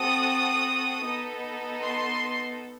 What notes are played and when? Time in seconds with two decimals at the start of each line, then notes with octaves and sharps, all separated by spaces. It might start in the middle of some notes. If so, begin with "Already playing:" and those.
Already playing: C4 F#4 A4 D#6
1.03 B3 D#4 A4
1.82 C6